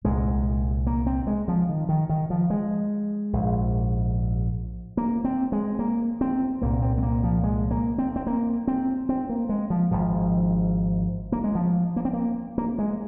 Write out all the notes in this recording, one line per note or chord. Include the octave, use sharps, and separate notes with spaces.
C2 A#2 G#3
A#3
C4
G#3
F3
D#3
D#3
D#3
F3
G#3
A#1 G#2
A#3
C4
G#3
A#3
C4
C2 A#2 A#3
C4
G#3
A#3
F3
G#3
A#3
C4
C4
A#3
C4
C4
A#3
G#3
F3
G#1 G#2 F3
A#3
G#3
F3
A#3
C4
A#3
A#3
G#3